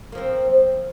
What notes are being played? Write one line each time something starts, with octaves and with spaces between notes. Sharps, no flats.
F3 A#3 C4